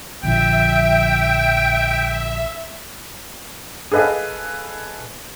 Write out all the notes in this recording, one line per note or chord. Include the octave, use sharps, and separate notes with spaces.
A#1 D3 F3 E5 G5
G#4 A4 B4 D#5 F5